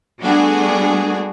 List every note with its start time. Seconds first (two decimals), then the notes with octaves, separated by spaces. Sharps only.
0.22 G3 A3 B3 D4 F#4 G#4